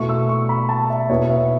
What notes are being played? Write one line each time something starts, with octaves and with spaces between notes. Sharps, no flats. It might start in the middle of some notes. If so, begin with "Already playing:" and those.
Already playing: B2 A3 E4 C#6
E6
C#6
B5
A5
E5
B2 B3 E4 C#5
E5